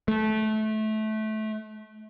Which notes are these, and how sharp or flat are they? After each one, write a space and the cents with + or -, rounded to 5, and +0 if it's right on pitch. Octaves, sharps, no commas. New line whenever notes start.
A3 -20